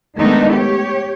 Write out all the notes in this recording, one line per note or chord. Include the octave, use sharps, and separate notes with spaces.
D#3 G#3 A3 B3 D4 D#4
G4 C#5